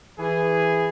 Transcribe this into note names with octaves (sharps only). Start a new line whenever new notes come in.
E3 G#4